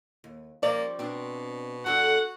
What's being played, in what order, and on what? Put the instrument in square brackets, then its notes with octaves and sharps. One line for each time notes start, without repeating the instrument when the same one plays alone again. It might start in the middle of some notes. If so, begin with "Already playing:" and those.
[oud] D#2
[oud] F3 G3 C#4 [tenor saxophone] A#3 [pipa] D5
[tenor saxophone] B2 [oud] C4 D4
[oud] E2 D4 A4 [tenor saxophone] F#4 [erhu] F#5